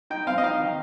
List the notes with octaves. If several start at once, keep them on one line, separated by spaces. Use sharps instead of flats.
D#4 G5
C4 F5
D#5
D#4 F5
D#3